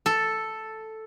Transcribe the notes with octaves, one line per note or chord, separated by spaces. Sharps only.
A4